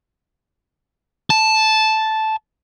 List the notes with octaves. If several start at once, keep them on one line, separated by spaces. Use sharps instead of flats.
A5